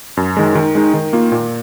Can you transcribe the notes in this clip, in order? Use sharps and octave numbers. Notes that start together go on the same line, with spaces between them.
F#2
D#3 G#3
D#3
G#3 D#4
D#3
A#3 F4
A#2